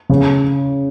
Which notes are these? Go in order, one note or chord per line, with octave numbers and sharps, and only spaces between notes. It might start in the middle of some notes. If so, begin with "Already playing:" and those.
C#3